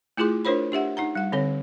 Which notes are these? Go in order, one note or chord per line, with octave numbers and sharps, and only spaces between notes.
A3 E4 F4 G#4 C6 D6
D4 F4 A#4 C5 C#5 B5
D4 G4 E5 F#5
D#4 F#5 A#5
G3 F#5
D3 C4 A4 C#5